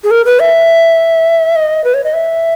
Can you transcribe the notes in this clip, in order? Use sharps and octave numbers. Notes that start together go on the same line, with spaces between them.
G#4
A#4
B4
E5
D#5
B4
C#5
D#5
E5